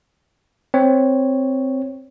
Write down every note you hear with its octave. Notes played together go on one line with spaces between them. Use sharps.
C4 C#5